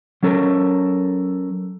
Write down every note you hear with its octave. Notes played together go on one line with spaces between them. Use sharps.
F#3 C#4 A4 A#4